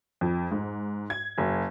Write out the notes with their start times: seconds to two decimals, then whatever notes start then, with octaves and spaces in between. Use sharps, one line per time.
0.21 F2
0.51 G#2
1.10 G#6
1.38 F#1